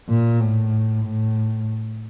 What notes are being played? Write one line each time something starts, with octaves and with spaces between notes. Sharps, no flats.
A#2
A2
A2